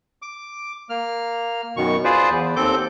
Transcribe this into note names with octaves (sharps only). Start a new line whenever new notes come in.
D6
A#3 F6
F#2 B2 D#3 C#6
F4 G#4 B4 C5 D5
E2
D#2 C4 A4 D6 G6